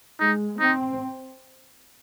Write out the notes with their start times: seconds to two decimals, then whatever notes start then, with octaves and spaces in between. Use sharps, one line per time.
0.20 G#3 D#4
0.60 C4 D#4